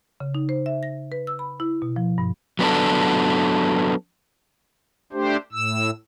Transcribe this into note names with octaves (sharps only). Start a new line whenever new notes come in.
C#3
D#4
C5
E5
A#6
B4
E6
B5
E4
B2
F3
G2
F#3 B3 D4 A4
A3 D4 G4 C5
A2 E6